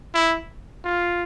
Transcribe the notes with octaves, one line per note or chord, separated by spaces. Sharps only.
E4
F4